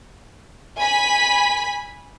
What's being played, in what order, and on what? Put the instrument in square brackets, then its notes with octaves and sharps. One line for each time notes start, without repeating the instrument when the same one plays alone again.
[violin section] G#5 B5 B6